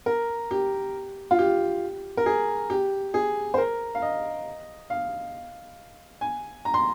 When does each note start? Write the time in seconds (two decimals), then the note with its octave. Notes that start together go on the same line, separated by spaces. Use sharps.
0.06 A#4
0.51 G4
1.31 F4
1.39 G4
2.17 A#4
2.26 G#4
2.70 G4
3.14 G#4
3.54 C5
3.58 A#4
3.95 F5
4.02 D#5
4.90 F5
6.21 G#5
6.65 A#5
6.74 C6